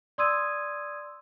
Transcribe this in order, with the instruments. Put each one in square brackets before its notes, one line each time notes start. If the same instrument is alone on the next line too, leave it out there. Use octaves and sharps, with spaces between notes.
[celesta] D5 C6 D#6 E6 G#6 D#7